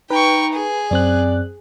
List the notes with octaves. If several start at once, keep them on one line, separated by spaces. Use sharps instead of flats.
D#4 B4 G5 C#6
G#4
F#2 C4 D5 F#6